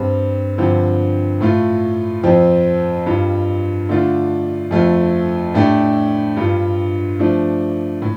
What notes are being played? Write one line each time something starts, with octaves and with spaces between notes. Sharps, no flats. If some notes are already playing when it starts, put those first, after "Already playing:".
Already playing: G2 G3 C4
G2 D3 F3 C4
A2 A3 F4
F2 F3 C4 F4
G2 G3 F4
D3 A3 D4 F4
F2 F3 A3 F4
A2 A3 D4 G4
G2 G3 F4
F3 A3 D4
A2